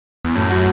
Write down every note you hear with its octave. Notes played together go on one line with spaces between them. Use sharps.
E2
F#2 A2
F#4